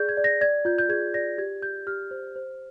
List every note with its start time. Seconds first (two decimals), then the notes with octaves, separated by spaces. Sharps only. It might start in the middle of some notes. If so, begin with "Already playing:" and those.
Already playing: G#4 D5 G6
0.09 G#6
0.17 D5
0.24 A#6
0.41 D5 G#6
0.65 F4 G6
0.78 G6
0.89 G#4 G#6
1.14 D5 A#6
1.38 G4 G#6
1.62 G4 G6
1.87 G4 F6
2.11 C5
2.36 C5